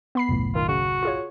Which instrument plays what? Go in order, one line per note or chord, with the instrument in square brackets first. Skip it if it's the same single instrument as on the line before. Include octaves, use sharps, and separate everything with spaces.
[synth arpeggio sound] B3 B5 C7
[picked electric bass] F#1 B1 A2
[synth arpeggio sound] D#3 [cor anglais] F4
[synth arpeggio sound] C#3 [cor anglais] F#4
[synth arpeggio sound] F4 G#4 C#5